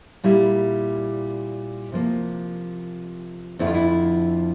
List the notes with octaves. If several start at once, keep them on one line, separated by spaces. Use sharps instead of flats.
A#2 G3 A#3 E4
C3 F3 A#3
F2 D3 F3 A3 E4
F4
E4